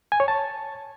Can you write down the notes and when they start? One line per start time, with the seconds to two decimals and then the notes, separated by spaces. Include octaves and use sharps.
0.12 G#5
0.20 C#5
0.28 A5